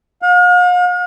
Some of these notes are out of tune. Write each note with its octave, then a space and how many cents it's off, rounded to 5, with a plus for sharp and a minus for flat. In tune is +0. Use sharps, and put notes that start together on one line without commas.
F5 +45